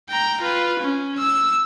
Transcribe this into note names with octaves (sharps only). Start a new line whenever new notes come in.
G5 A#5
F4 B4
C#4
E6